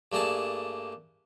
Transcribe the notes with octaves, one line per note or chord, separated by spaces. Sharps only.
G2 A3 A#3 G#4 A5